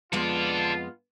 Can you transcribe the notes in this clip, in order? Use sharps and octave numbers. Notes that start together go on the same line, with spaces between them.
F2 G#3 B3 F4 A4 D5